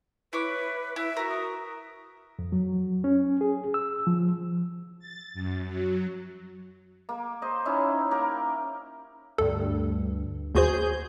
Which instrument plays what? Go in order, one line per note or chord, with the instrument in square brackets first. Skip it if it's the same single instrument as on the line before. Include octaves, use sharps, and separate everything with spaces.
[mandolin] E4 C#5 D6 [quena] B4
[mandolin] E4 [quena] E5
[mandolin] F#4 A#4
[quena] D#6
[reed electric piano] F2
F#3
C#4
G#4
E6
F3
[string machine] A6
F#2
F#3
[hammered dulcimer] A#3
C5 D#5
C#4 D#4 E4
A#3 G4 A#4
[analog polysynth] D2 G2 [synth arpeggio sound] A4
[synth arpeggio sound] D#2 F#4 C5 [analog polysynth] G#4 G6